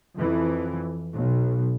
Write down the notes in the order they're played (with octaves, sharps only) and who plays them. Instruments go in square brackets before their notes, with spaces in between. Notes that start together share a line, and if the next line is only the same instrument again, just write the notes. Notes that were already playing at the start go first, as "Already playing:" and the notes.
[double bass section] F2 E3
B1